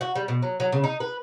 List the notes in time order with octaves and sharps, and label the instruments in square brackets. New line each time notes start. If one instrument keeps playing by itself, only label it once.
[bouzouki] F#4
G3
B2
F#3
F#3
C#3
D#4
B4